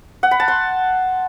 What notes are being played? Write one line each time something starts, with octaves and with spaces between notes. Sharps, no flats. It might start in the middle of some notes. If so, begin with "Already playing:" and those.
F#5
B5
A5
C6